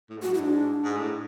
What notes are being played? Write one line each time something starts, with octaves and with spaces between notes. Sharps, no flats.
A2
G#2
F#2 F#4
G#2 E4
D4
G#2
A2